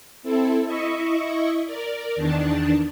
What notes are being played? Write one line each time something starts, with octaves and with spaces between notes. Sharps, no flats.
C4 E4 A4
E4 D#5 E5 C#6
A#4 D5
E2 D#3 D4 A5